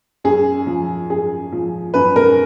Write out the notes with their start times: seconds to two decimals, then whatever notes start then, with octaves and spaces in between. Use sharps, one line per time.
0.24 F#2 G#4
0.67 F3
1.10 F#2 G#4
1.52 F3
1.94 F#2 B4
2.16 A#4